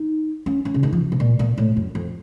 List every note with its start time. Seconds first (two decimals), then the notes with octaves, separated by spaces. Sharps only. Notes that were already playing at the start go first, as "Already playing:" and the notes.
Already playing: D#4
0.46 C#4
0.65 C#4
0.74 C#3
0.83 D#3
0.93 F3
1.12 C3
1.20 A#2
1.39 A#2
1.58 A2
1.77 F#2
1.95 F2